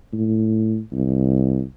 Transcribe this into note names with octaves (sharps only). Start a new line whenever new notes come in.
A2
C2